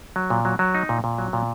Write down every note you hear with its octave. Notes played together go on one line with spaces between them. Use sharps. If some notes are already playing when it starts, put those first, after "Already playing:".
F#3
A#2
F#3
F#3
D#4
A#2
A#2
F#3
A#2